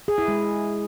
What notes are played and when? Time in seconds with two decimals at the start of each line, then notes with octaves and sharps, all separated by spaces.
0.08 G#4
0.18 E4
0.28 G#3